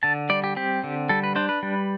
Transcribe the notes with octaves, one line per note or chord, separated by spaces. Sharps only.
D3 A5
G3 D5
G4
C4 G4
D3
G3 A4
B4
D4 C5
B4
G3